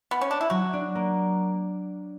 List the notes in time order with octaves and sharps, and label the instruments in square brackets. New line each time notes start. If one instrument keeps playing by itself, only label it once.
[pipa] B3
C#4
D4
E4
[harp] F#3 [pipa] F#4
[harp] D4
A#3